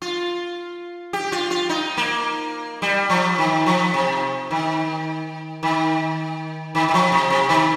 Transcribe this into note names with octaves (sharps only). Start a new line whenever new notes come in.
F4
G4
F4
F4
D#4
A#3
G3
F3
D#3
F3
C3
D#3
D#3
D#3
D#3
F3
C3
C3
D#3